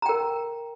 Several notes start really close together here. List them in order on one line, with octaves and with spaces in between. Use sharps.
A#5 G5 A#4